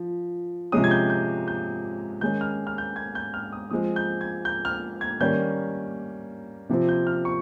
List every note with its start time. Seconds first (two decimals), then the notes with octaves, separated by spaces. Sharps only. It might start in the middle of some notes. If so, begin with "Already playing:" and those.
Already playing: F3
0.72 C3 F3 G#3 C#4 D#6
0.84 G#6
0.91 G6
1.10 G6
1.48 G6
2.21 D#3 G#3 C#4 G6
2.41 F6
2.67 F6
2.78 G6
2.96 G#6
3.15 G6
3.34 F6
3.52 D#6
3.71 F3 G#3 C4 D#6
3.96 G6
4.21 G#6
4.45 G6
4.65 F6
5.01 G#6
5.21 D#3 G3 A#3 C#4 G6
6.69 C3 F3 C4
6.89 G6
7.07 F6
7.25 C#6